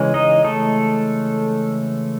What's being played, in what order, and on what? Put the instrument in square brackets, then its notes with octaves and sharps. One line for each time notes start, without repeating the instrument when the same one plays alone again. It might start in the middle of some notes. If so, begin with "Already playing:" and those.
Already playing: [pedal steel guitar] C#3 E3 G#3 C#4
D#4 D#5
A3 A4